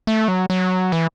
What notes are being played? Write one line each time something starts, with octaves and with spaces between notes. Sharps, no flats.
A3
F#3
F#3
E3